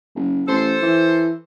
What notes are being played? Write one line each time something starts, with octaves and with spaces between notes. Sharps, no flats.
F#1
A1 A4 C5
E3